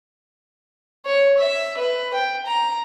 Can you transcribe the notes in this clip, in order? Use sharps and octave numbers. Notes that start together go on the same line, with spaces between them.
C#5
E5
B4
G5
A#5